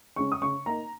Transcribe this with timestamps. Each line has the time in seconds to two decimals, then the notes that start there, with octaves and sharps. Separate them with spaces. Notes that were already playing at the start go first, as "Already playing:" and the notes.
0.16 C#3 G#3 C#4 C#6
0.32 D#6
0.42 C#3 C#6
0.66 A#3 D#4 A#5